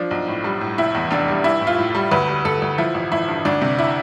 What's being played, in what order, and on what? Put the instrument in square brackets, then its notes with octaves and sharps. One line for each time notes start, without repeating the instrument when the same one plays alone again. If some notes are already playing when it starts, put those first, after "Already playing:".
Already playing: [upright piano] F3 D4
B1
A2
G3
A2
F1 E4
E2
F1 D4
G3
E3 E4
A2
F4
A2
G3
D2 B4
G3
D2 A4
D2
F3 E4
A1
A1 E4
G2
D2 D4
C3
E4